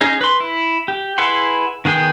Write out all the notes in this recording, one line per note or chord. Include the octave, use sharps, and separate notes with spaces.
C#4 D#4 G#4
B4 C6
E4
G4
E4 G#4 B4 F#5 C6
D#3 B3 G#4 G5